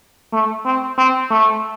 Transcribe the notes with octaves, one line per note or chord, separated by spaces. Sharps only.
A3
C4
C4
A3